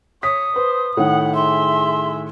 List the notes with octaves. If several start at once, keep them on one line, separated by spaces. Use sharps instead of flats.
C#5 D#6 B6
B4 C5
A2 D#3 F#5
G#4 E5 C6